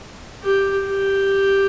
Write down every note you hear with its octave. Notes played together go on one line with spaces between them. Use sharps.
G4
G4